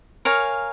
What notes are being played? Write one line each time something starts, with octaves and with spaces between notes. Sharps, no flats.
A#4 C#5 F5 G#5